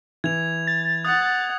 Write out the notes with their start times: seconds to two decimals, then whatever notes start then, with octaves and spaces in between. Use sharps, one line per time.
0.24 E3 G#6 F7
0.67 A6
1.05 F#5 D#6 A6